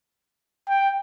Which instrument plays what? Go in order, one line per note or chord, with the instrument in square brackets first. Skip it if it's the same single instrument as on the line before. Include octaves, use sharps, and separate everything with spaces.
[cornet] G5